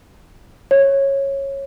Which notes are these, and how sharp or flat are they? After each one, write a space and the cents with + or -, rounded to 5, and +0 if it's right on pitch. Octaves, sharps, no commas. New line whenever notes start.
C#5 -15